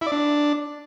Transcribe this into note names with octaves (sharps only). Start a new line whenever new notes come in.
E4
D5
D4